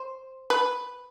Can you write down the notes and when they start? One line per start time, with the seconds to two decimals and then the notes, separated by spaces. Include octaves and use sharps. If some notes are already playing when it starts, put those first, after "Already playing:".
Already playing: C5
0.50 B4